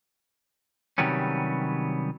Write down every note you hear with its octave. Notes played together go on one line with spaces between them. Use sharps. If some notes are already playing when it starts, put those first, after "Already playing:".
C3 D#3 F#3 G3 B3 C#4